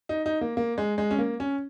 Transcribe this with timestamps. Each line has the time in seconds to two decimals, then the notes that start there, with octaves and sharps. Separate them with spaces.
0.09 D#4
0.26 D#4
0.41 A#3
0.57 A#3
0.78 G#3
0.98 G#3
1.11 C#4
1.19 A#3
1.40 C#4